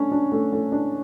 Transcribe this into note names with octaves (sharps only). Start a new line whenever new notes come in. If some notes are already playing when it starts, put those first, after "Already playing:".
Already playing: A3 C#4 D4
D4
A3
A3
D4